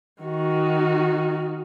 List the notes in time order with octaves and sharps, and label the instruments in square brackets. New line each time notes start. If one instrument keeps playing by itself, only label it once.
[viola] D#3 F#4